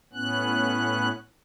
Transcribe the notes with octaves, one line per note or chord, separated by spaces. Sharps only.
A2 B3 C#4 F#6